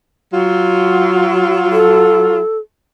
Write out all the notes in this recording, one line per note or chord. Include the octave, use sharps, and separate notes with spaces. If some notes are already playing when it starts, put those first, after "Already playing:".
F#3 F4
A4